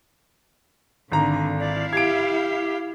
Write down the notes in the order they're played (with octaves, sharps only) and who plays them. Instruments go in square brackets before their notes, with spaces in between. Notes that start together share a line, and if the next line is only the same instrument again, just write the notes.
[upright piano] G#1 A#5 [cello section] D3
[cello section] E4 F5 [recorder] D5
[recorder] G4 [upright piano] G#6 D7